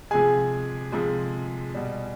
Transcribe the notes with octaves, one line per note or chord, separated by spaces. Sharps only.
C3 F3 G#3 G#4 G#5
C3 F3 G#3
B2 G3